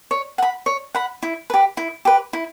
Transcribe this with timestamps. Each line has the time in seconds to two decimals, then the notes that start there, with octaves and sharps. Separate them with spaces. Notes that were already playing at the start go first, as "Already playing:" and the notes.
0.11 C#5
0.38 F#5 B5
0.66 C#5
0.95 F#5 B5
1.23 E4
1.50 G4 B4
1.77 E4
2.05 G4 B4
2.33 E4